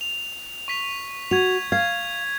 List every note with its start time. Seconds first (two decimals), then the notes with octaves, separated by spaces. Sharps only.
0.01 F7
0.68 C#6 B6 F7
1.31 F#4 G#6 F7
1.72 F5 G#6